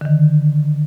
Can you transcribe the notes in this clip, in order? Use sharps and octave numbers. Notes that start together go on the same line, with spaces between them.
D3 D#3